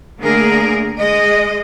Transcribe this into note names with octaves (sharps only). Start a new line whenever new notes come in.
D3 A3 A#3 G#4 A#4
G#3 D#5